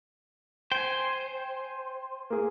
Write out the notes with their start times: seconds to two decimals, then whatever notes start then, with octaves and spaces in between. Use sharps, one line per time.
0.72 C5 G5 G#5
2.30 A#3 G#4